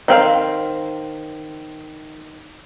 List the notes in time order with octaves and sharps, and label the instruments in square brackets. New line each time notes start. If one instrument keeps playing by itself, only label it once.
[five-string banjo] D#3 C4 F5